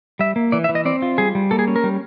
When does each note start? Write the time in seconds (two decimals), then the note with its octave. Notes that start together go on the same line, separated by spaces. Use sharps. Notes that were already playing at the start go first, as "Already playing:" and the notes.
0.19 G3 E5
0.36 A#3
0.52 E3 D5
0.64 E5
0.69 E3
0.75 D#5
0.85 C4 D5
1.02 F4
1.18 G3 G#4
1.35 G3
1.51 A#3 A4
1.59 G#4
1.68 C#4
1.76 A#4
1.84 G3